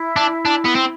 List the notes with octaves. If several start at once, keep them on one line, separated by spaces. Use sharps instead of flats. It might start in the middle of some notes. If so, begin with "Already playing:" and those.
Already playing: E4
D4
D4
B3
C4